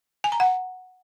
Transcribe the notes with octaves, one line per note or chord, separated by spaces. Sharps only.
G#5
A#5
F#5